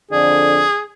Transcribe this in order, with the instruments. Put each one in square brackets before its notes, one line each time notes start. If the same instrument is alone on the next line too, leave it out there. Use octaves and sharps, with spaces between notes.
[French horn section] F2 D3 D5 [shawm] G#4